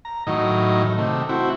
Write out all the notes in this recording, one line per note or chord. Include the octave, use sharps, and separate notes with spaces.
A#5
A2 D#3 F#3 D#5
C3 A3
C4 E4 F#4